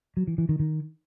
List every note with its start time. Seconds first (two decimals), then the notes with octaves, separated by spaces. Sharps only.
0.17 F#3
0.27 E3
0.38 E3
0.49 D#3
0.60 D#3